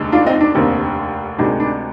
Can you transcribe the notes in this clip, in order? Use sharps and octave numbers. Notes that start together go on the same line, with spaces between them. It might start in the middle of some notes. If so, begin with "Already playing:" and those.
Already playing: F1 D#2 D3 G#3
D4 F4
C4 D#4
D4
F1 D#2 D3 C4
D2 C3 D#3 G#3 D4
D4